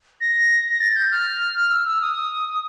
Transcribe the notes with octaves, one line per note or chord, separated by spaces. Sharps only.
A#6
A6
G6
F6
E6
E6
D#6